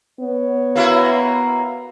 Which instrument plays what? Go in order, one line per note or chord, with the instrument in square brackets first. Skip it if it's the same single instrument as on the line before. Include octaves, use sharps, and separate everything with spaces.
[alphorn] B3 [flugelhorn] C#5
[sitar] A#3 E4 F#4